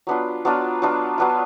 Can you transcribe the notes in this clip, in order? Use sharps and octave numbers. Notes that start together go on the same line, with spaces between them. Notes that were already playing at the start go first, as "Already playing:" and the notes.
F#3 B3 D4 F4
F#3 B3 D4 F4
F#3 B3 D4 F4
F#3 B3 D4 F4